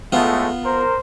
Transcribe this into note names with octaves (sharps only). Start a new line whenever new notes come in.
A2 G#3 A3 B3 F4
A#4 C5